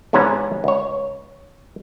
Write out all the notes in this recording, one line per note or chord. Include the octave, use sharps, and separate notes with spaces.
E2 G#2 C3 C#4 B4 A#5
C#2 C#5